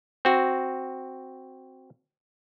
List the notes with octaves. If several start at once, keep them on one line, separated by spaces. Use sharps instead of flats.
C4 F#4